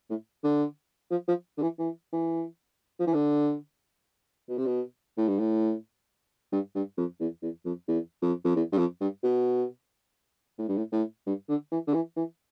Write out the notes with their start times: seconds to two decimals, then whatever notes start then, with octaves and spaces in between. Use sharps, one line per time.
0.10 A2
0.44 D3
1.11 F3
1.28 F3
1.58 D3
1.62 E3
1.79 E3
2.13 E3
3.00 F3
3.07 E3
3.14 D3
4.49 B2
4.58 C3
4.66 B2
5.18 A2
5.28 G2
5.39 A2
6.52 G2
6.75 G2
6.98 F2
7.20 E2
7.43 E2
7.65 F2
7.88 E2
8.22 F2
8.45 F2
8.56 E2
8.72 G2
8.78 F2
9.01 G2
9.23 B2
10.58 A2
10.68 G2
10.78 A2
10.92 A2
11.26 G2
11.49 D3
11.72 E3
11.87 D3
11.94 E3
12.16 E3